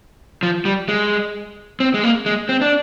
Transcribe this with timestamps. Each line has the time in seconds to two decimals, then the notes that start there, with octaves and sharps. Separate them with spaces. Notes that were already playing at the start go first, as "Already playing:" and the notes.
0.43 F3
0.65 G3
0.89 G#3
1.80 C4
1.94 G#3
2.03 A#3
2.26 G#3
2.49 C4
2.61 D4